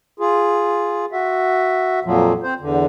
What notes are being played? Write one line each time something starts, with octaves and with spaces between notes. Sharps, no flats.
F4 G#4
F#4 E5
F2 A#2 F3 F#3
C4 C5
E2 D3